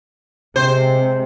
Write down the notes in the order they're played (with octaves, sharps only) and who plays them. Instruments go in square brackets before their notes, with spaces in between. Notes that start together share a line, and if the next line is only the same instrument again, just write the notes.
[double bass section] C3 G#3 [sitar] C5